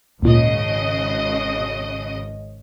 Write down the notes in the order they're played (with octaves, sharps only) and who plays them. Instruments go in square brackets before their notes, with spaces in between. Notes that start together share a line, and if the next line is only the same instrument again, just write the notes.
[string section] G#1 C#3 D#5 [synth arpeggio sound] D2 A#2